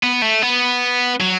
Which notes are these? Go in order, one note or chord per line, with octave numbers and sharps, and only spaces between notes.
B3
A3
B3
F#3